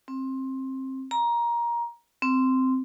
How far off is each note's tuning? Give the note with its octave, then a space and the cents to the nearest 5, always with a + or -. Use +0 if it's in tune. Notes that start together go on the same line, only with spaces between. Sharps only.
C4 +20
A#5 +20
C4 -10